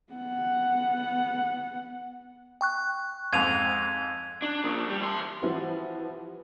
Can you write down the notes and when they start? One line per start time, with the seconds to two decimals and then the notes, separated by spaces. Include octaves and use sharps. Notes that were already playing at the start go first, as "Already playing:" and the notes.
0.13 B3 F#5
2.61 G5 C#6 F#6
3.33 F2 G#2 G#6 D#7 F7
4.42 D4
4.64 A#2 F3
4.89 G3
5.01 E3 C6
5.42 E3 F3 G3 B3 E4 F#4